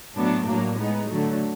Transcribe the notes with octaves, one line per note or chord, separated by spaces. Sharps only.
A2 F#3 B3 D4
A2 F#3 A#3 D4
G#3 B3 D#4
D3 F#3 A3